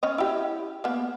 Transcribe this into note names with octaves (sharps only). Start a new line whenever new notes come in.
C#4 C#5 D#5
E4 G4
A#3 B3